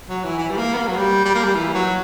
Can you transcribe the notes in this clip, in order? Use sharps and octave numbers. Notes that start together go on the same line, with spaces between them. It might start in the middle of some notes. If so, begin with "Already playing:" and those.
F#3
E3
E3
G3
A#3
B3
A#3
F#3
G3
G3
A#3
G3
E3
F#3